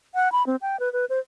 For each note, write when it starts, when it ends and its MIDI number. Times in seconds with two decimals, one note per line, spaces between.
0.15 0.31 78
0.32 0.45 83
0.47 0.56 60
0.62 0.79 79
0.80 0.92 71
0.93 1.05 71
1.10 1.19 72